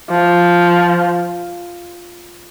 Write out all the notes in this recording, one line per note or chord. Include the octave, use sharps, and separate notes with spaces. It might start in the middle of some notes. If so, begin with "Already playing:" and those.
F3